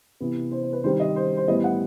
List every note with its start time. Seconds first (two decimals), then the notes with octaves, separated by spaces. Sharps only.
0.20 C3 E3 B3
0.51 C5
0.63 C5
0.73 B4
0.83 D#3 G3 C4 C5
1.00 D#5
1.16 C5
1.37 C5
1.47 A2 E3 G3 B3 D#5
1.64 F#5